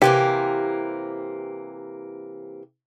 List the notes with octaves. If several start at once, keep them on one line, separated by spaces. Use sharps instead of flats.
C3 E3 A#3 G4